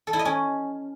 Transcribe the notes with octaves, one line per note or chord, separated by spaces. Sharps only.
A4
E4
D#5
C#4